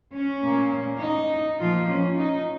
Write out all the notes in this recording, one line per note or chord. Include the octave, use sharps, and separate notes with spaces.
C#4
A#2 A#3
D#4
A#2 F3 A#3 F4
C#4
D#4